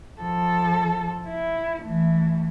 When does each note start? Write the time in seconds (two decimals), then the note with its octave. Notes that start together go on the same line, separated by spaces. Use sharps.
0.20 F3 A4
1.26 E4
1.83 E3 A3